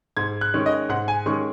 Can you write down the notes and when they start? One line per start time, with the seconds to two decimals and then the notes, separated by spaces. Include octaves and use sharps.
0.17 G#2 G#6
0.41 F#6
0.54 D#3 G#3 C#4
0.66 D#5
0.89 G#2 F#5
1.08 G#5
1.26 D#3 G#3 C#4 C#6